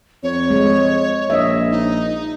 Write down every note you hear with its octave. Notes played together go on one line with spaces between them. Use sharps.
F2 C#5
G#3
A#1 D#5 E5
D#4